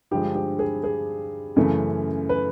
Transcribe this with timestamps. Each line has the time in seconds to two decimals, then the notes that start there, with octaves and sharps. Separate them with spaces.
0.11 G2 D3 F3 G#3 G4
0.35 G4
0.59 G#4
0.84 G#4
1.56 F#2 C#3 E3 A3
2.29 B4